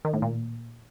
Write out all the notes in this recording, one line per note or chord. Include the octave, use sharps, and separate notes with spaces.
D#3
A2
A#2